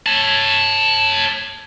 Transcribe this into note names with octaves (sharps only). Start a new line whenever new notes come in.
C#5 A5